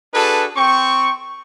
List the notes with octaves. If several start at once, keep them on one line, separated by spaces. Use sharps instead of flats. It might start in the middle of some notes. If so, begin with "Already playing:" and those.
D4 F#4 G#4 A4 B4
C4 G5 C#6